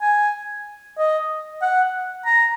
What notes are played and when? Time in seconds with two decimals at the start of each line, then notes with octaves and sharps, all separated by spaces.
0.01 G#5
0.98 D#5
1.62 F#5
2.26 A#5